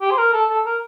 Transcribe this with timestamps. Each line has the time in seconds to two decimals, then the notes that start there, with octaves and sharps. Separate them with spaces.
0.01 G4
0.11 C5
0.18 A#4
0.33 A4
0.50 A4
0.66 A#4